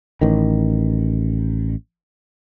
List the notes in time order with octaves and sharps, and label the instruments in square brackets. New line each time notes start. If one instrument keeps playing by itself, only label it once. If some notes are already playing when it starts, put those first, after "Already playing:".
[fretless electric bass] A1 D#3